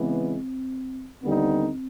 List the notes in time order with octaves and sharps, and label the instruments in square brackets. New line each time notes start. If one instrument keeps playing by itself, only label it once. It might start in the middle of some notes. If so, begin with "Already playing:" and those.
Already playing: [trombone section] C#3 E3 G#3 B3 [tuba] C4
[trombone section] D#2 D3 G3 B3 D#4 [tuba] C4